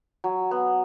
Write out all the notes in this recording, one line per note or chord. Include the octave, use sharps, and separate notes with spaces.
F#3
B3